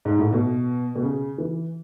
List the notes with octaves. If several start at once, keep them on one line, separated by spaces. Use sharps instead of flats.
G#2
A2
B2
B2
C#3
E3